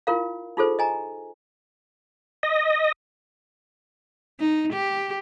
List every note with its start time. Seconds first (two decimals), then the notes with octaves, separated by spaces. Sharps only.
0.07 E4 F4 A#4 F5
0.57 D#4 F4 G#4 A4 C5
0.79 D#5 G#5 A#5
2.43 D#5
4.40 D#4
4.73 G4